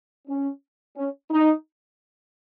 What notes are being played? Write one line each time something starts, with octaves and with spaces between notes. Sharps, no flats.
C#4
C#4
D#4